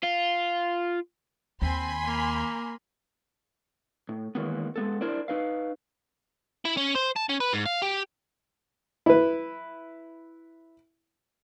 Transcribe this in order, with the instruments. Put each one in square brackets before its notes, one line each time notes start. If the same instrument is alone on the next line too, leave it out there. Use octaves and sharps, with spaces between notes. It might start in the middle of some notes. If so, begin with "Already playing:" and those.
[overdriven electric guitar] F4
[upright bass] D#2 [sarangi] C4 [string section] G#5 B5 C6
[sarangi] A#3
[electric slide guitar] A2
D#3 E3 G#3 A#3 B3
G#3 B3 A4
D4 E4 A#4 C5 D5
D#4 B4 F5
[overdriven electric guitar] E4
C#4
C5
A5
C#4
B4
G#2
F5
G4
[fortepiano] E4 B4